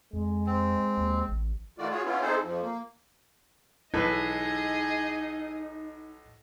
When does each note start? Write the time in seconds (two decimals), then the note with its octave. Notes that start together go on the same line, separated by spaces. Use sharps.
0.13 F2 G#3
0.47 C4
0.97 D#2
1.28 A1
1.78 D#3 E3 A3 F4 F#4 D5
1.90 F4 F#4 G#4 C#5
2.05 B3 C#4 E4 F4
2.21 C4 D#4 E4 G#4 A4 C5
2.42 F2 F3
2.62 A#3
3.94 B1 D#4 E4 G#4 A4 B4 D#5